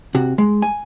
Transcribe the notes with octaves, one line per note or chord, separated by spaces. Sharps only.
C3 F#4
G#3
G#5